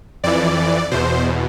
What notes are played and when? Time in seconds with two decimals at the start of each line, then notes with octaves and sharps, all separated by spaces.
0.24 F2 E3 D5
0.91 E2 B2 C5